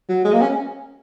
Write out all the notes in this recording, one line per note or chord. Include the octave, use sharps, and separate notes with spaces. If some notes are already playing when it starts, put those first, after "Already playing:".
F#3
G#3
A#3
C#4